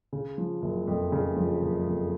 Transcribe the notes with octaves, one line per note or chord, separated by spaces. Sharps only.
C#3
F3
F#1
F2
C#3
F3
F#1
F2